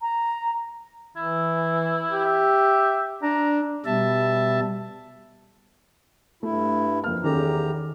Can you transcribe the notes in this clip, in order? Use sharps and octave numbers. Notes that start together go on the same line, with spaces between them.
A#5
E3 E4
G4
E5
D4 A#5
B2 G3 E5 A5
G2 A3 E4
F2 A#3 F6
E2 D#3 C#4 G4 A4 A#5